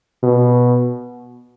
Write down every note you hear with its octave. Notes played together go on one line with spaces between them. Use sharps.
B2